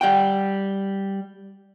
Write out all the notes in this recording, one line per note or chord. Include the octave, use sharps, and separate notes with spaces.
G3 F#5 G5